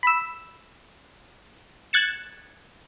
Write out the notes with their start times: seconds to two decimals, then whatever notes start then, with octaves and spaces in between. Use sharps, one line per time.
0.03 B5 E6
1.93 F#6 G#6 A6 C#7 E7